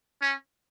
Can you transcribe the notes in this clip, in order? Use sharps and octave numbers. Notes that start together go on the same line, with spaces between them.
C#4